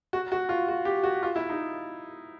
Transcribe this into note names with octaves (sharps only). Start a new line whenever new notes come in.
F#4
F#4
F4
F#4
G4
F#4
F4
E4
D#4